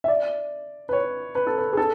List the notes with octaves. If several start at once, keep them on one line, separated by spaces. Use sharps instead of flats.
E5
D5
B4
C#5
B4
A4
B4
G#4
A4